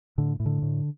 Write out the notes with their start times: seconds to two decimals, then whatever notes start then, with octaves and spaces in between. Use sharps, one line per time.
0.18 A2 D3
0.40 A2
0.46 D3
0.62 A2